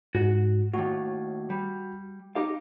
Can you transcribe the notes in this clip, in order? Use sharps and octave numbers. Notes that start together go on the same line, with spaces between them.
G#2 F#4
D#2 A2 F#4
G3
D#4 G4 F5